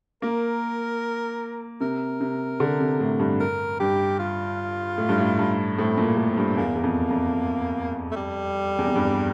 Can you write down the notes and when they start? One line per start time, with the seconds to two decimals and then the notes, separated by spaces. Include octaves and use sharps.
0.22 A#3 A#4
1.81 C3 A#4
2.21 C3
2.60 D3
2.80 C3
3.00 A2
3.19 G2
3.40 A#4
3.80 G2 G4
4.19 F4
4.98 A2
5.09 G2
5.18 A2
5.39 G2
5.78 A2 C4
5.98 A#2
6.04 A#3
6.17 A2
6.30 C4
6.37 G2
6.57 E2 A#3
6.75 E2
6.84 F2
7.10 F2
8.11 A3
8.16 G3
8.79 E2
8.87 F2
8.96 G2